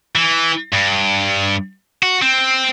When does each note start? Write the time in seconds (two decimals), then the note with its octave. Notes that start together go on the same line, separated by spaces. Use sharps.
0.16 E3
0.72 G2
2.03 F#4
2.22 C4